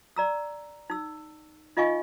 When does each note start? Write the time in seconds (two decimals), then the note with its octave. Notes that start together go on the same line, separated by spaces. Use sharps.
0.16 D5 A#5 E6
0.90 D#4 E6
1.77 D#4 F4 D#5 F5 G#5 C#6